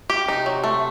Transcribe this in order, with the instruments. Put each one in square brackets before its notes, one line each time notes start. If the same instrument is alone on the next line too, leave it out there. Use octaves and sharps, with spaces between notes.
[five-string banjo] G4
[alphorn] C3 [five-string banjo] D#4
[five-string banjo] F#3
A3